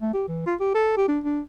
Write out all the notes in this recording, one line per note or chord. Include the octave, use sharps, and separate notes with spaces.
A3
G4
E3
F4
G4
A4
G4
D4
D4